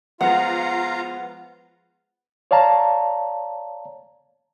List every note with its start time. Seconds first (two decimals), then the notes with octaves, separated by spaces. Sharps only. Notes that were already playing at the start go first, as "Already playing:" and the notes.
0.21 F3 G#3 B3 F4 F5 F#5 A#5
2.51 C#5 D5 F5 A5 A#5